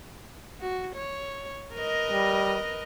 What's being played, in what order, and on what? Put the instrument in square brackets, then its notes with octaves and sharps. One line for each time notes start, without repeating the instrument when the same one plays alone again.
[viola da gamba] F#4
C#5
A#4 B4 D#5
[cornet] G3